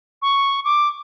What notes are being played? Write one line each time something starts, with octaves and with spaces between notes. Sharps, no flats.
C#6
D6